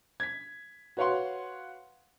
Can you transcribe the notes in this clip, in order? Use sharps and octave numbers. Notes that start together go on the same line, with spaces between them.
G#6 B6
F#4 B4 C#5 F5 F#5 C6